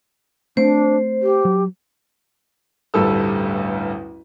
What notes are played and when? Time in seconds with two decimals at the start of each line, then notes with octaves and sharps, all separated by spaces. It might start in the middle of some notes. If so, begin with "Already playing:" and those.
0.57 A3 C4 D4 C5
1.22 G4
1.45 F#3
2.94 A1 D2 G2 G3 A4 E6